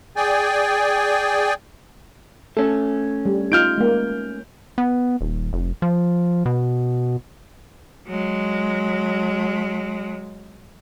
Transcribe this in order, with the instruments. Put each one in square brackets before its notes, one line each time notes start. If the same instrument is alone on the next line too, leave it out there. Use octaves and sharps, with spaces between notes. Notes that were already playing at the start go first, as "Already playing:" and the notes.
[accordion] G#4 D5 G5 G#5
[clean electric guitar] A3 C#4 [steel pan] A4
[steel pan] G3
[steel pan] D#4 F4 [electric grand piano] F6 G6 D7
[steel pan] G#3 A#3
[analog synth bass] B3
D#1
F1
F3
B2
[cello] F#3 G#3